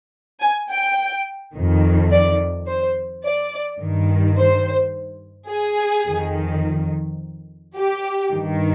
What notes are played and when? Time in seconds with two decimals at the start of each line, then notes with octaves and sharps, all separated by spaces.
0.41 G#5
0.70 G5
1.55 F2 D#3
2.11 D5
2.67 C5
3.24 D5
3.80 G2 D#3
4.37 C5
5.50 G#4
6.06 F2 D#3
7.75 G4
8.32 G2 D#3